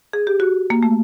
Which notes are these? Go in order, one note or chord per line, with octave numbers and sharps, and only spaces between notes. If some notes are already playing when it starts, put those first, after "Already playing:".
G#4
G4
F#4
A#3
A3